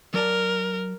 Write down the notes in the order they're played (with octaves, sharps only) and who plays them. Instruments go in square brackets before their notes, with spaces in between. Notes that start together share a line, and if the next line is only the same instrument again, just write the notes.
[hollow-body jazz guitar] F#3 D5 A5 [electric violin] A#4